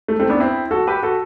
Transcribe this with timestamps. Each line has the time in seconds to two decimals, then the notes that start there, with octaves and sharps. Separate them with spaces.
0.08 A3
0.20 A3 C4
0.29 B3 D4
0.40 C4 E4
0.71 F#4 A4
0.87 G4 B4
1.02 F#4 A4